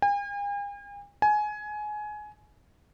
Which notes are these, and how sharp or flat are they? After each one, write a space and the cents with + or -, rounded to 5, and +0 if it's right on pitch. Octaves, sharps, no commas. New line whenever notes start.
G#5 -45
G#5 +20